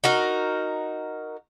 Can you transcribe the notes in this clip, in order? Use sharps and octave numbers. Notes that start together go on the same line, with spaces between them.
D#4 F#4 A#4